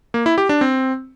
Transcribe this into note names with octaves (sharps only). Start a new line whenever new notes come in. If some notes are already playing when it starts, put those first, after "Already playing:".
A#3
E4
G4
D4
C4